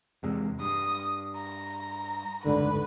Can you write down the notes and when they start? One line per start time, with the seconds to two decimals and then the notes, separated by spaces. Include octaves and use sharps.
0.23 E2 C3 G#3
0.60 G2 D#6
1.35 A#5
2.45 F#1 D2 G#2 D3 B4